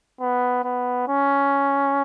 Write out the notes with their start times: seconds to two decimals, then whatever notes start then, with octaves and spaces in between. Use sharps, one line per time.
0.21 B3
0.64 B3
1.08 C#4